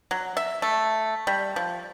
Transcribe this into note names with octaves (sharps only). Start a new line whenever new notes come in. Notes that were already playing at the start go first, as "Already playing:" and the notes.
F#3
E5
A3
G3
F3